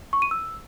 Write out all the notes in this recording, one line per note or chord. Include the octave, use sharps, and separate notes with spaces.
C#6
D#7
E6